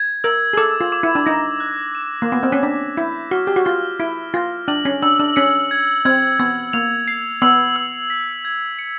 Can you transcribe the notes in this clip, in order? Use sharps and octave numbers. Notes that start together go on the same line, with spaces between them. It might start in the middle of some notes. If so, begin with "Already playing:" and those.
Already playing: G#6
A#4 E6
G#4
A4 D6
F4
D6
E4
D4
D#4 A#6
F#6
E7
A#3
B3 D6
C4
C#4
D4 B6
E4 G6
F#4 F6
G4
F#4
F4 F6
E4 D7
F4 A#6
D4 F#7
C#4
D4 E6
D4
C#4 C#7
G#6
C4 G#6
B3 G#6
A#3 F7
C7
B3 E6
E6
B6
G#6
C#7